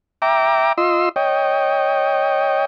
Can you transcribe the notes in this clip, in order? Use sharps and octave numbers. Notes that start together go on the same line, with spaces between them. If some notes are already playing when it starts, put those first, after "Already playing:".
E5 G5 A#5 D6
F4 D#5 C6 E6
C#5 D#5 G5